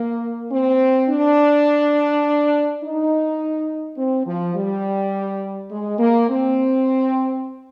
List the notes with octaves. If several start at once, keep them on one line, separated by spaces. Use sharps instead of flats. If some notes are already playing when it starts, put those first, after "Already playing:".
Already playing: A#3
C4
D4
D#4
C4
F3
G3
G#3
A#3
C4